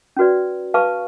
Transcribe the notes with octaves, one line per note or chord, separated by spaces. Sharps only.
C#4 F#4 B4 D5
B4 F5 A5 C#6